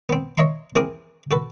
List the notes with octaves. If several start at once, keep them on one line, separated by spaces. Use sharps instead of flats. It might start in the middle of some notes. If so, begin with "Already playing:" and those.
B3 C4
C#5 D#5 E5 A#5 C6
E3 C4 G#4 A#4 D6 D#6
F#4 A4 B4